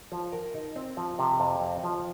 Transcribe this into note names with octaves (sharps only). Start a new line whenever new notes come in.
F3
A#4
D#4
C4
F3
C3
F2
C4
F3